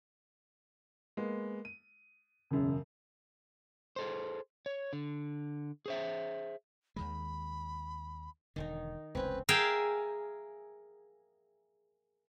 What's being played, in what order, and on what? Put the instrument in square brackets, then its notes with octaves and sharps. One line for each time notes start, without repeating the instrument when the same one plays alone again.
[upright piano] G#3 A#3 B3
D#7
[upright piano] E1 F#2 [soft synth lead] C#3
[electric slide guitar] G#4 A4 C5
C#5
D3
G#4 C5 E5
[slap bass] D#2 D#3 G#3 [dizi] B5
[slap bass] E1 D3 [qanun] D#3 D#4
[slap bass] F1 C#2 [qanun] C4 C#4 [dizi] B4
[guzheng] G#4 A#4 E5 F5 G5 G#5